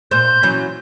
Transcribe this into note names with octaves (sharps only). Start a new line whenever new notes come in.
A#2 C5 G6
E3 F#3 C#4